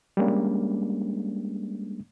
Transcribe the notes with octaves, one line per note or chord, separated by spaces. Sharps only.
G3 G#3 A#3 C#4 D4